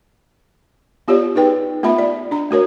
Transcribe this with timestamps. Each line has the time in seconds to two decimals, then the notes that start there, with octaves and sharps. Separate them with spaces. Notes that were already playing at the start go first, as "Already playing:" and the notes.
1.08 B3 F4 G4 C#5 D5
1.35 D#4 G#4 B4 G5
1.83 A3 B3 F4 E5 B5
1.98 D5
2.31 D4 A#5
2.51 A3 F#4 A#4 C#5